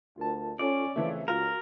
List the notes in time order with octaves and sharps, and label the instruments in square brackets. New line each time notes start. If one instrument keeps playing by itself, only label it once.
[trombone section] D2 [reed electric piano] F4 A#4 A5
[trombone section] C#4 [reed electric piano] F4 A4 [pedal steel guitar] D5
[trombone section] F2 C#3 [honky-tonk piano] E3 A3 [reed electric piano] E5
[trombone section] C#2 [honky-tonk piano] F4 [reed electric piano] F#4 [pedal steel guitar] A#4